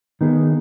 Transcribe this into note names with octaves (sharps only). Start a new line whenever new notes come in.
D#3 B3 D#4 G#4